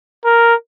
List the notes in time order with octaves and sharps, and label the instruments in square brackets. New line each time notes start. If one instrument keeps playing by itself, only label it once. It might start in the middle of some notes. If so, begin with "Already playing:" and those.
[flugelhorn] A#4